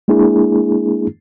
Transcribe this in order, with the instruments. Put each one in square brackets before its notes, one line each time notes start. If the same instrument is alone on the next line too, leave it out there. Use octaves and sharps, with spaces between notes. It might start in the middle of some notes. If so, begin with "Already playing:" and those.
[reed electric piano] G#3 A#3 D4 E4 G#4